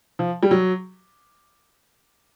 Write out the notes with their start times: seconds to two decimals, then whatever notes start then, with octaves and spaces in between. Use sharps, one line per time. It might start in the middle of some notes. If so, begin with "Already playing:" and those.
0.19 F3
0.43 G3
0.51 F#3